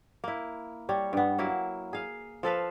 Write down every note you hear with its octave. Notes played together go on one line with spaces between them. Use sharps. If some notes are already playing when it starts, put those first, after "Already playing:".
A#3 E4
G3 C#5
G2 B3
F#3 A#3 E4
G#4 F5
F3 A4 B4 F5